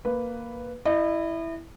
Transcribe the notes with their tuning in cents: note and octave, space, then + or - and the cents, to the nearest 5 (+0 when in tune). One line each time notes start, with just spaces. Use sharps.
A#3 +0 B4 +0
E4 +0 D#5 -40